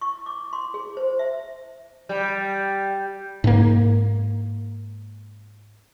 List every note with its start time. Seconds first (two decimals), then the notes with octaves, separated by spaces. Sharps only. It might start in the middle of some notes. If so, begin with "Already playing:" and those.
0.01 C#6
0.26 D6
0.53 C6
0.74 G#4
0.97 C5
1.19 E5
2.09 G3
3.44 G#2 A#3